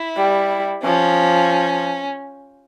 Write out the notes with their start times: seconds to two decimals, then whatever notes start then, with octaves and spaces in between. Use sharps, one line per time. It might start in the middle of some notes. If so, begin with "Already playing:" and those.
Already playing: E4
0.16 G3
0.84 F3 C#4